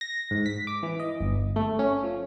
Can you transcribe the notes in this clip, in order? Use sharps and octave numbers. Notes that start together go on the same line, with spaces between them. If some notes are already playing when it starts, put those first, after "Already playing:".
A#6
G#2
B6
D6
E3
D#5
G1
A3
C#4
F3